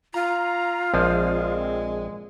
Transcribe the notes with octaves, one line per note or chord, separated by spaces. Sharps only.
F4 A#5
A#1 F3 G#3 C4